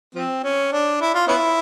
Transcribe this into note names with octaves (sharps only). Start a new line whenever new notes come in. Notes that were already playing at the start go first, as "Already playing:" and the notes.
F3 C4
C#4
D4
E4
F4
B3 C#4 E4